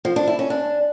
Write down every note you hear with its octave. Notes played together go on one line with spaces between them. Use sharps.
F3
D4
E4
C#4
D4